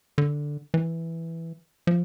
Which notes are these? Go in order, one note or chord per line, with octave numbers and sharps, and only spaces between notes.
D3
E3
F3